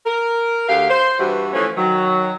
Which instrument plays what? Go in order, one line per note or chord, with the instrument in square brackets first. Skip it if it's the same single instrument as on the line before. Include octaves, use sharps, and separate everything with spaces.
[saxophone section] A#4
D2 G4 F5
C5
G2 E3 G3 F#4
E3 F3 A3 C#4
D#3 F#3